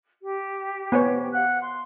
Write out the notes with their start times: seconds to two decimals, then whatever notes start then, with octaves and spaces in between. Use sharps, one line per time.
0.22 G4
0.92 B3 C5 C#5
1.33 F5 F#5 F#6
1.61 C6